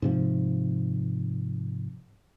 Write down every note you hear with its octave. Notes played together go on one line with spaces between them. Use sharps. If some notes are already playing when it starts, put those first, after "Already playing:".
G#2 C3 F3